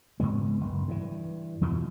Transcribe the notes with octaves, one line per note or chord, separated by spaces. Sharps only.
C#2 G#2 G#3 B3
F#1
G2 E3
E2 B2 E3 F3